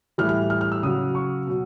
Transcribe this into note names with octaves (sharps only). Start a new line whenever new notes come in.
A2 E3 G3 F6
F6
F6
F6
E6
C#3 F#3 D#6
C#6
B2 F#3